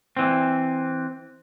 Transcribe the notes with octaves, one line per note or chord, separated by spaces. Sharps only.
E3 C4